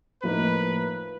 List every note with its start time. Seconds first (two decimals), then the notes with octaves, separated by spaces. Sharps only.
0.22 A2 F3 A#3 D#4 B4